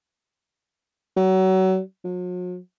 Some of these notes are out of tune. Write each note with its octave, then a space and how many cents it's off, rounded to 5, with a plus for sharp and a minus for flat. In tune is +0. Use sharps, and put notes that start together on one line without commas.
F#3 +30
F#3 -45